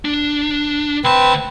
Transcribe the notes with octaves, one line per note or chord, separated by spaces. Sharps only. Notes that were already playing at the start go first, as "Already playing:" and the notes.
D4
D2 C4 B4 A5